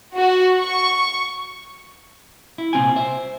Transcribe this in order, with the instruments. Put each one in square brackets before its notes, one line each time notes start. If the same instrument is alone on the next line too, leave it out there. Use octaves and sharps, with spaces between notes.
[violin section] F#4
C#6
[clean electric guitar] E4
C2 A#2 C4 F4 G5 G#5
C5 E5